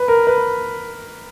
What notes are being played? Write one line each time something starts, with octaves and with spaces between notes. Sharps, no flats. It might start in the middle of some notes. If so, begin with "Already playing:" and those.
Already playing: B4
A#4
B4